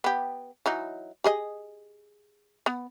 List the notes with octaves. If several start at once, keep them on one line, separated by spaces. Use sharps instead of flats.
B3 G4
E3 F#3 D#4
G4 G#4 D#5
B3